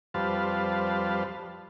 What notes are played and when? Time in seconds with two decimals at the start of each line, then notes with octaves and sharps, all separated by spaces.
0.14 F2 G3 B4 C5 F5 A5